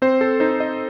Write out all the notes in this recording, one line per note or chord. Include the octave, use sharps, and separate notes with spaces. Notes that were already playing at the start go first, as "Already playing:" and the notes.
C4 C5
A4
D#4 C5
D#5